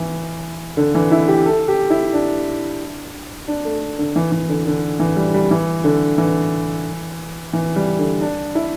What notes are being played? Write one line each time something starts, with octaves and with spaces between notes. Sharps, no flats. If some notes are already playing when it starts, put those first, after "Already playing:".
Already playing: E3
D3
E3
E4
G4
A4
G4
E4
D4
D4
A3
D3
E3
E3
D3
D3
E3
G3
G3
E3
D3
E3
E3
G3
D3
D4
E4